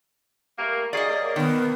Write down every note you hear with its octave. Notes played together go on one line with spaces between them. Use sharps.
G3 A3 A#3
A#3 F#4 G#4 D5 D#5
A#3 C#5
B2 D#3 B3